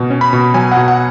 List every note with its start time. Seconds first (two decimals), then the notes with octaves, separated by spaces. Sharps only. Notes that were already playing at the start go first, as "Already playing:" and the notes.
Already playing: B2
0.10 C#4
0.21 B5
0.33 B2
0.54 F#3 G#5
0.72 F#5
0.77 B2
0.88 F#5